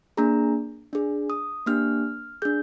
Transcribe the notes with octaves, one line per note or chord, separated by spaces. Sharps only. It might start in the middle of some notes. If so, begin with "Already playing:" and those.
A#3 D4 G#4 A#5
D4 G#4
D#6
A#3 D4 G4 F6
D4 G#4 G6